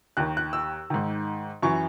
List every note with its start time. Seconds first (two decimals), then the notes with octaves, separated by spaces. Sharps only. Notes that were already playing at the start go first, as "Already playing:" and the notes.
0.17 D#2 D#3 F#6
0.37 F#6
0.53 E6
0.90 G#2 D#3
1.63 F#2 E3 C#6